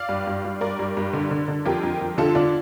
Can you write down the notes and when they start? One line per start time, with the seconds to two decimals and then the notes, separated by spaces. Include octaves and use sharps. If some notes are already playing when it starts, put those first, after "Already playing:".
Already playing: D5 F5
0.09 G2
0.27 G2
0.45 G2
0.61 G2 A#4 D5
0.79 G2
0.97 G2
1.13 D3
1.31 D3
1.48 D3
1.65 F2 G4 A#4
1.83 F2
2.01 F2
2.18 D3 F4 A4
2.35 D3 D4 F4